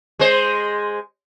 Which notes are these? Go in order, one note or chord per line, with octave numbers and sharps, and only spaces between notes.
G#3 C5